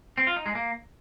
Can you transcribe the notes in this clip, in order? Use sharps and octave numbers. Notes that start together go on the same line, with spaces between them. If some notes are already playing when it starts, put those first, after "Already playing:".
C4
F4
D#4
G#3
A#3